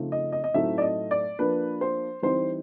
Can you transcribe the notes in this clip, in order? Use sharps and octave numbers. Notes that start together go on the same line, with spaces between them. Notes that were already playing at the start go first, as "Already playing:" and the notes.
Already playing: C#3 F3 A3 C4 D#4
D#5
D#5
D#5
A2 F#3 A3 C4 D#4 E5
D5
D#5
D5
F3 A#3 D4 B4
C5
E3 G3 C4 D#4 C5